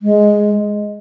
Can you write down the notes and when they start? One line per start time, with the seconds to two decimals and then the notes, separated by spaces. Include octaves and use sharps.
0.02 G#3